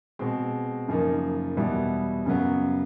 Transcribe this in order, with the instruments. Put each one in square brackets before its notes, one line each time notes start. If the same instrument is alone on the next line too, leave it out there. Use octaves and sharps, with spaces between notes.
[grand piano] B2 G#3 C4
F#2 C#3 F3 A#3 D#4
E2 B2 G3 B3 E4
F#2 C#3 F#3 B3